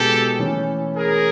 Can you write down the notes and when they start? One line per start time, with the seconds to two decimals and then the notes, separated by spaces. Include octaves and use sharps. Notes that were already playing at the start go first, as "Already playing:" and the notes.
Already playing: B2 G#3 B3 E4 G4 A4
0.39 E3 A3 C#4
0.96 G#4 A#4